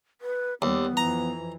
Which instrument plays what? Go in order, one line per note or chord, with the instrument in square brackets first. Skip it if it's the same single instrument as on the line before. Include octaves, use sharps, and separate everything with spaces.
[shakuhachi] B4
[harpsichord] D#2 [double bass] G3 [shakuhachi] B3
[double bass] F2 E3 [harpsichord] A#5